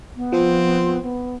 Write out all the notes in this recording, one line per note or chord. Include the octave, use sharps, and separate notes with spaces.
B3
F3 C4 F4
B3